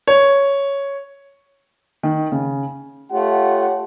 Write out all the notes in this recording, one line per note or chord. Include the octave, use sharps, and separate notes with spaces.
C#5
D#3
C#3
A3 F4 G4 C#5 F#5